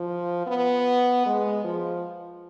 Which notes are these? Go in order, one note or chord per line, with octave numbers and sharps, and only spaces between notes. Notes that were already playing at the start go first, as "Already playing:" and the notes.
Already playing: F3
B3
G#3
F3